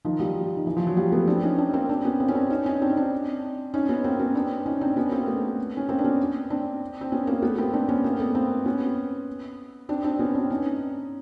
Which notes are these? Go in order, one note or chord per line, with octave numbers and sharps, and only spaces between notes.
D#3 F3
F3 G3
D#3
E3
F3
F#3
F3 G3
A3 B3
C4 D4
C#4 D#4
C4 D4
A#3 C4
C4 D4
B3 C#4
A#3 C4
C#4
C4 D4
C#4 D#4
C#4 D#4
C4 D4
D#4
C4 D4
C#4 D#4
B3 C#4
A#3 C4
B3 C#4
C4 D4
C#4 D#4
C4 D4
B3 C#4
A#3 C4
A3 B3
C#4
A#3 C4
D4
B3 C#4
C4 D4
C4
B3 C#4
A#3 C4
A3 B3
A#3 C4
C4 D4
B3 C#4
A#3 C4
A3 B3
A#3 C4
B3 C#4
C4 D4
C4 D4
B3 C#4
C4 D4
C#4 D#4